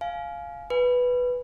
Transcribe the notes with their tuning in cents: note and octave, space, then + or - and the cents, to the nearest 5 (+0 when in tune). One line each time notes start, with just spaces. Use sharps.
F5 +0 G#5 +25
B4 +0 G#5 -10